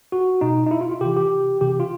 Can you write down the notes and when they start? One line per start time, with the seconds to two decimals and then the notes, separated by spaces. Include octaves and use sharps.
0.12 F#4
0.41 B2 D#4
0.66 D#4
0.71 E4
0.81 F4
0.91 F4
1.01 C3 E3 G4
1.17 G4
1.61 C3 E3 G4
1.80 F4